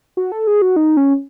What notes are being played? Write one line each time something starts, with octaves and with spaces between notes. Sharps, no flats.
F#4
A4
G#4
F#4
D#4
C#4